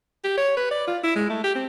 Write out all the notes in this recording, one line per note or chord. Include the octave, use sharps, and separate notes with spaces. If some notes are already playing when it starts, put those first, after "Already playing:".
G4
C#5
B4
D5
F4
E4
G#3
A3
G4
C4